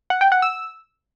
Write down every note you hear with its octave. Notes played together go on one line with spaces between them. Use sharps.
F#5
G5
F#5
E6